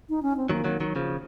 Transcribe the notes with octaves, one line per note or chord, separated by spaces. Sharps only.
D#4
C#4
C4
D#3 F#3 A#3
D#3 F#3
D#3 F#3
C#3 F3